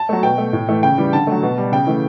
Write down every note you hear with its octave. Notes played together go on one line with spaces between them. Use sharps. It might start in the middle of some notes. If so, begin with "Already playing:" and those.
Already playing: A5
F#3 A3
B2 G5
A3
A2
E3 A3
C#3 G5
E3 G3
D3 A5
F#3 A3
B2
G3
C#3 G5
E3 A3